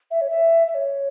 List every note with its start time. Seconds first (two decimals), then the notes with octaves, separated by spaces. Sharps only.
0.11 E5
0.21 C#5
0.30 E5
0.67 E5
0.75 C#5